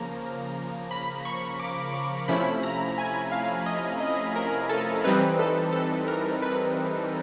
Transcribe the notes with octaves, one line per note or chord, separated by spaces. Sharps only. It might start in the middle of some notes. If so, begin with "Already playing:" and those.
Already playing: C#3 F3 A#3 A#5
B5
C#6
D6
D6
C3 F3 A3 C#4 E4 B5
A#5
G#5
F5
D#5
D#5
A#4
A4
E3 G3 C4 D#4 B4
A4
A4
A#4
B4